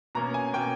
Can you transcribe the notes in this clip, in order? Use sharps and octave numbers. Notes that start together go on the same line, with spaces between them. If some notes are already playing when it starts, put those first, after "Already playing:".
B2 A#3 C#4 A#5
G#5
B2 A#3 C#4 G5